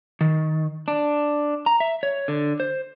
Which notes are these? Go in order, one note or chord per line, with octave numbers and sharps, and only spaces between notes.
D#3
D4
A#5
E5
C#5
D3
C5